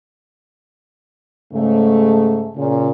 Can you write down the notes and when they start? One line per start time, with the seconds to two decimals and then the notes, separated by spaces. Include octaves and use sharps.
1.53 G#2 C#3 A3
2.57 A#2 C#3